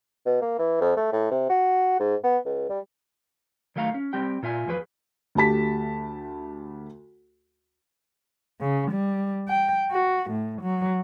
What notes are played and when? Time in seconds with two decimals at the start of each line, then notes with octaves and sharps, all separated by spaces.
0.26 B2
0.42 A#3
0.59 E3
0.81 F2
0.97 A3
1.12 A2
1.31 C3
1.50 F#4
2.00 G#2
2.24 B3
2.45 C#2
2.69 G3
3.76 D#3 F#3 A3 F5 A5 A#5
3.94 C#4
4.13 G3 C4 G4 G5
4.43 A#2 F4 E5 G#5
4.66 E2 F3 F#3 G#4 B4
5.35 D2 A3 G4 A5 B6
8.60 C#3
8.91 G3
9.48 G5
9.91 F#4
10.30 A2
10.62 F#3